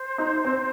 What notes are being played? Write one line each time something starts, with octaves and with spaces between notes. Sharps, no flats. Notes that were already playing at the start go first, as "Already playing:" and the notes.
Already playing: C5
D#4
C4